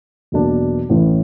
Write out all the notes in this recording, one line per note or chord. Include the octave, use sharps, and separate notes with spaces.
E2 B2 F#3 A#3 D4
A1 A2 E3